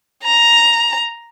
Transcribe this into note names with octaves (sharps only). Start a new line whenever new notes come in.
A#5